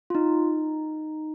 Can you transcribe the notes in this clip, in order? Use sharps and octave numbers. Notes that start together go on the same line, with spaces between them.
F4
D#4